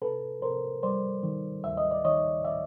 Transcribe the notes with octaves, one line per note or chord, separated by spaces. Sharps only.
C3 A4 B4
C3 A#4 C5
G3 C5 D5
D#3
D2 E5
D#5
D5
D#3 C#5 D#5
D5 E5